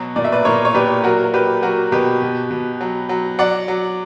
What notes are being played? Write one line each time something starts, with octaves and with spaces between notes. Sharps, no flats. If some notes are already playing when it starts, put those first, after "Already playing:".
Already playing: B2 F#3
A#2 D5
E5
B4 D5
A#2 A#4 C#5
C#5
A#2 G4 B4
F#3 F#4 A#4
A#4
F#3 G4 B4
F#3 F#4 A#4
B2 G4 B4
B2
B2
F#3
F#3
F#3 D5 F#5
F#3